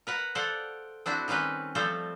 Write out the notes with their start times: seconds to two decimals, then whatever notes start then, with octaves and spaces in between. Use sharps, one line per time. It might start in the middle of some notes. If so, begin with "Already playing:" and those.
0.07 A#4 B4 F#5
0.35 A4 C5 D5 F5 F#5
1.06 C4 D4 E4 F#4
1.28 D#3 G3 C4 C#4 B4
1.75 F3 G3 A3 C4 A4 C5